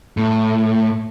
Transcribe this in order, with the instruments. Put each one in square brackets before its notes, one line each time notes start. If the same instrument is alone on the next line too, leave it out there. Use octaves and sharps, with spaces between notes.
[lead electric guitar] A2